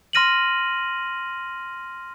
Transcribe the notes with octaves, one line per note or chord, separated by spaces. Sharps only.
C6 F6 A#6 D#7 F#7